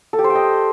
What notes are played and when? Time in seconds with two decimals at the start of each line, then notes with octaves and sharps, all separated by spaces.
0.13 A4
0.19 G4
0.24 C5
0.30 G5
0.35 D#5